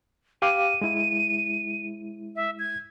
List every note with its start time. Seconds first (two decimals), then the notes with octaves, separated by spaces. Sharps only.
0.42 G4 F5 D6 D#7
0.81 G#3 E4
2.36 E5
2.59 G#6